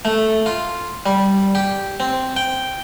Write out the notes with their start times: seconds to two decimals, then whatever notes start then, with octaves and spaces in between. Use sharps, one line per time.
0.05 A3
0.46 F4
1.06 G3
1.55 G4
2.00 C4
2.37 G5